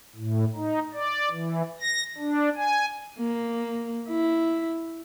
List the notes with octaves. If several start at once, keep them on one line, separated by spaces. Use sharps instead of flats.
A2
D#4
D5
E3
A#6
D4
G#5
A#3
E4